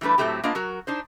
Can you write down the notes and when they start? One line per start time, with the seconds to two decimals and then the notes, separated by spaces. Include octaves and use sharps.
0.01 E3 G3 A3 D4 B4
0.18 A2 C3 F#3 A3 C4 G4
0.44 A#3 B3 D4 F4 D#5
0.55 F#3 F#4 A#4
0.87 D4 D#4 C5